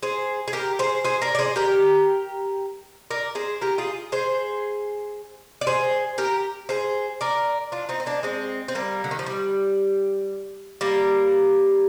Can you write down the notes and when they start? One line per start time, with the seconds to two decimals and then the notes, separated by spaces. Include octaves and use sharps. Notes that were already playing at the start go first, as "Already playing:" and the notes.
0.03 G#4 C5
0.48 G#4
0.53 G4 A#4
0.79 G#4 C5
1.04 G#4 C5
1.22 A#4 D5
1.35 D5
1.39 G#4 C5
1.56 G4 A#4
3.10 A#4 D5
3.35 G#4 C5
3.61 G4 A#4
3.78 F4 G#4
4.12 G#4 C5
5.61 D5
5.67 G#4 C5
6.18 G4 A#4
6.69 G#4 C5
7.21 A#4 D5
7.72 D4 F4
7.89 C4 D#4
8.00 C4
8.06 A#3 D4
8.23 G#3 C4
8.68 C4
8.75 G3 A#3
9.04 D3
9.11 D#3
9.19 F3
9.26 G3
10.81 G3 A#3